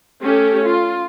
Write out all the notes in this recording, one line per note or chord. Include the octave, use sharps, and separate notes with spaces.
A3 C#4 G4 A4
F4